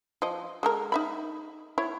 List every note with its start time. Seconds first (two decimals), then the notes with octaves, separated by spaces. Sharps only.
0.22 F3 D#5
0.63 G#3 A4 A#4
0.92 D#4 E5 B5
1.78 E4 C#5